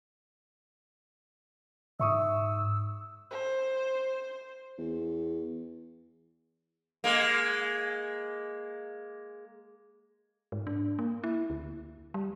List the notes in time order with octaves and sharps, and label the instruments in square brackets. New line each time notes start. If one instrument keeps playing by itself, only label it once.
[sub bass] G#2 [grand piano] E5 C#6 D#6 [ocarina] E6
[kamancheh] C5
[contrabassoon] E2
[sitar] G#3 A#3
[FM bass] G#2
D4
A#3
E4
D2
G3